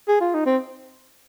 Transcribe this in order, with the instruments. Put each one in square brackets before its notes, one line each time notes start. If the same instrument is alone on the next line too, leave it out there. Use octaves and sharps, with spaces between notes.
[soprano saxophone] G#4
F4
D#4
C4